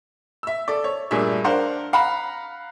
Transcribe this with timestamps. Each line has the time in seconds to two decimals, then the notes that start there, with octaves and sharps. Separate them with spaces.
0.43 E5 E6
0.68 A4 D5
0.84 C#5
1.11 G2 A#2 A3 D4 G#4 E5
1.44 D4 A#4 C5 F5 F#5
1.93 F5 F#5 A#5 B5